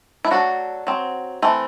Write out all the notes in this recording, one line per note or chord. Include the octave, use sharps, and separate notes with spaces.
E4
F#3 A3 D4 F#4
F#3 C4
E3 A3 C4